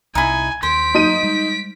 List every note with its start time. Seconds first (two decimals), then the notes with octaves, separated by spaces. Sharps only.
0.15 C2 D#4 E4 G#5
0.63 D#2 C5 B6 D7
0.94 F#3 A#3 D#4 D#7
1.23 G3 G#3